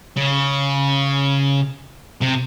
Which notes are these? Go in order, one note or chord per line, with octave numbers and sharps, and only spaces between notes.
C#3
C3